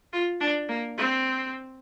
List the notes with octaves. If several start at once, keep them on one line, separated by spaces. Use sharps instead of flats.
F4
D4
A#3
C4